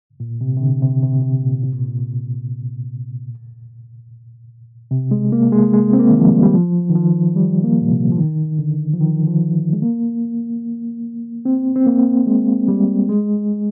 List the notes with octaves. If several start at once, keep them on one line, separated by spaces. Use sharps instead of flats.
A#2
C3
C3
D3
C3
C3
C3
A#2
C3
A#2
A#2
C3
G#3
A#3
G#3
G#3
C4
A#3
D#3
F3
G3
G3
F3
D#3
F3
G3
A#3
A#2
C3
F3
D#3
D3
F3
D#3
F3
G#3
A#3
C4
C4
A#3
G#3
G3
G#3